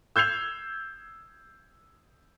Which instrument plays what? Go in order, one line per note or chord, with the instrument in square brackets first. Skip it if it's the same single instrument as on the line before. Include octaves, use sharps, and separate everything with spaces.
[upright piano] E6 G6 G#6 C7 F7